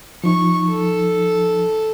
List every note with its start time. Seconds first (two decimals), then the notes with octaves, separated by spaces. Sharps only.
0.24 F3 D#4 C#6
0.69 A4